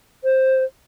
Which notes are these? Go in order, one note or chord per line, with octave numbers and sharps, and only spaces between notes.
C5